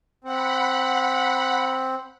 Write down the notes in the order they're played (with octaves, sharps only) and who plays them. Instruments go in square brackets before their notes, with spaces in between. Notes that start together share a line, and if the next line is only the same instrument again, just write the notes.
[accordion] C4 [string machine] F#5 B5